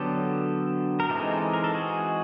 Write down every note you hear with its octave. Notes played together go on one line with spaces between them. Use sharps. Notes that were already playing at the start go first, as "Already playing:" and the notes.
Already playing: D3 F#3 B3 G4 A4
A#4
E3 G#3 C4 D#4 G4 A4
A#4
A4
F#4 G#4